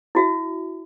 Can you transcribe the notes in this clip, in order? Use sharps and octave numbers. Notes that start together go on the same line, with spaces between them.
E4 F#4 E5